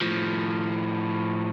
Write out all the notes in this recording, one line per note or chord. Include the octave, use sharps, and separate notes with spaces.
A2 F3